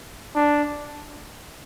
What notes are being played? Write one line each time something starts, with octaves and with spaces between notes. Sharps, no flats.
D4